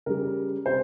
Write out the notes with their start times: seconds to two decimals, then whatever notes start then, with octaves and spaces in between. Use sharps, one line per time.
0.06 C#3 G3 A#4
0.66 C3 C5